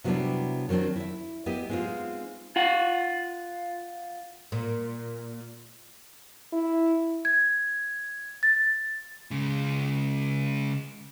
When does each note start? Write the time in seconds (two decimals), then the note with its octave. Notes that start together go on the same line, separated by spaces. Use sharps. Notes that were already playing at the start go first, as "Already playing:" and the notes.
0.04 C3 F#3 G3 B3 D4 E4
0.69 D#3 F#3 B3 C4 D4
0.96 E4 E5
1.46 F#3 B3 E4 G4 D#5
1.69 G#3 B3 C4 D#4 F4
2.56 F4 F#5
4.52 A#2
6.52 E4
7.25 G#6
8.43 A6
9.31 C#3 G#3